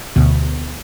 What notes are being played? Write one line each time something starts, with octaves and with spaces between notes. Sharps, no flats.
D2 B2